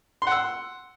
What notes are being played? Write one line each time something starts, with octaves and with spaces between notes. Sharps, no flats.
F#5 C6 E6